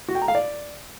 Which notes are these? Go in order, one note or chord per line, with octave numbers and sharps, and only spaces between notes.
F#4
G5
A#5
F5
D5